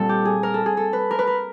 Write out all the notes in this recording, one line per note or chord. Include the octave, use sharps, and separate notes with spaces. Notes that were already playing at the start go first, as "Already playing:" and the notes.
Already playing: A#2 G3 C4 A4
G4
G#4
A#4
A4
G#4
A4
B4
A#4
B4
A#4